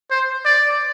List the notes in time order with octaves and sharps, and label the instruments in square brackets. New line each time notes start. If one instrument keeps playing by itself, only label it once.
[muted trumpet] C5
D5